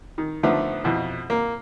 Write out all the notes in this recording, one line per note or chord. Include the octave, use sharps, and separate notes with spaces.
D#3
D3 D#3 F3 A3 B3
F2 B2 E3
A#3